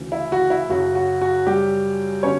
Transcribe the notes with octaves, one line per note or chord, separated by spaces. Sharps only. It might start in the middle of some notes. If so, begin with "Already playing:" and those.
Already playing: D2 C#3 E3
E4
F#4
E4
F#2 C#3 F#3 F#4
F#4
F#4
G3 G4
D3 F#3 B3 C#4 C#5